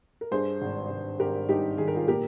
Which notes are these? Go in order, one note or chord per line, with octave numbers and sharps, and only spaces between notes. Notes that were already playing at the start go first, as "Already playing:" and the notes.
A#4
G2 G#4 C5
G#1
G#1
G#1 G4 A#4
G2 D#4 G4
D#3 G#4
A#4
F4 G#4
A#2 G4 A#4